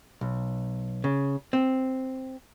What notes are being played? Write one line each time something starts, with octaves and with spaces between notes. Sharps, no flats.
B1
C#3
C4